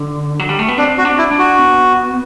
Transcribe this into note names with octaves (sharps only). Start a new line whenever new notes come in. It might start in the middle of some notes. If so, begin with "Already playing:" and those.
Already playing: D3
F#3
G3
A3
B3
C4 D4
F#4
D4
E4
D4
F#4
B3